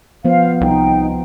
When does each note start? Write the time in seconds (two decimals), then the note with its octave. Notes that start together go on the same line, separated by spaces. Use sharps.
0.25 F3 B3 C5 F5
0.61 C2 D#4 G5